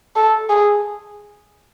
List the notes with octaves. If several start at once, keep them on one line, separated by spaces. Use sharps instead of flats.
A4
G#4